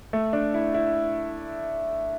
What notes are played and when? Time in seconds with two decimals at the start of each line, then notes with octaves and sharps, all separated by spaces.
0.13 A3
0.33 D4
0.54 E4
0.74 E4